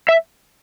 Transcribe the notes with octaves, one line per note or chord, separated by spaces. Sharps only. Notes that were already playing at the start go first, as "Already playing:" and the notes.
E5